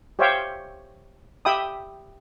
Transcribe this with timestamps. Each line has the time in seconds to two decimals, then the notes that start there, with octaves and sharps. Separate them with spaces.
0.19 G4 C5 C#5 E5 F5 G5
1.45 G4 E5 G5 B5 D#6